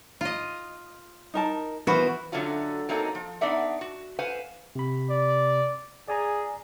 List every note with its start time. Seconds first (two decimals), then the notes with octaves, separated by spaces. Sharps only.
0.21 F4 D#5
1.34 D#4 A#4 A5
1.87 E3 B3 F#4 A#4 C5 B5
2.32 D3 F#3 A3 C#4 F4 F#4
2.89 F#3 A#3 C4 D#4 A4 D#5
3.15 F3
3.41 B3 D4 D#4 D5 E5 F#5
3.81 F#4
4.19 B4 C5 F5 F#5 G#5
4.75 C3 B5
5.10 D5
6.08 G#4 D5 G#5 A#5